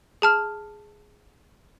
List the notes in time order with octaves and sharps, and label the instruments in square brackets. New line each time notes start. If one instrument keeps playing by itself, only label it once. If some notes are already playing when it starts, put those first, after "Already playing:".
[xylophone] G#4 A5 F6